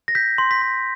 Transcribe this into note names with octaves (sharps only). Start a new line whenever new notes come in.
A#6
G6 B6
C6
B6
C6